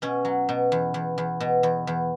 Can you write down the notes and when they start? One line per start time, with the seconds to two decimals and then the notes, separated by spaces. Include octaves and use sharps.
0.02 B2 C#4
0.25 F#3
0.49 B2
0.72 E2
0.94 E2
1.18 E2
1.40 B2
1.63 E2
1.87 E2